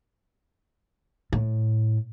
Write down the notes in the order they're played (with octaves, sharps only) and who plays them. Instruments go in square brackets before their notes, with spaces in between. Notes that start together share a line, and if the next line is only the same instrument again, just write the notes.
[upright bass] A2